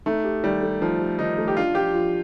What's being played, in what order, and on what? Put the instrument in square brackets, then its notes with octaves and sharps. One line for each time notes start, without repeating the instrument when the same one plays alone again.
[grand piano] A3 [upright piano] D#4
[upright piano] G4
[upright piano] D#3 [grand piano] G3
[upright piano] A3
[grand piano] F3 [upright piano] D#4
[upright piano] G4
[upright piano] D#3 [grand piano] D#4
[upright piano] A3
[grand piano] G4
[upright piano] D4 [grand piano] F4
[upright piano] F3 [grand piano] G4
[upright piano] F3